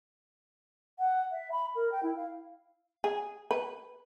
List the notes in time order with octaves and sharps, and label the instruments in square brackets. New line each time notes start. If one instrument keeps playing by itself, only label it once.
[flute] F#5
E5
B5
A#4
G5
E4
F5
[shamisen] G#4
B4